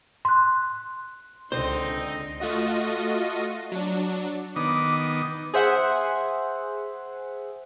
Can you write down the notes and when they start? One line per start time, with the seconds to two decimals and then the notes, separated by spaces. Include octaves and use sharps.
0.25 C6 F#6
1.52 C#2 D3 C4 D#4 C5
2.40 A3 F4 F#4 D#5
3.72 F#3 D4
4.56 D#3 B3 D6 D#6
5.54 G#4 C5 E5 F#5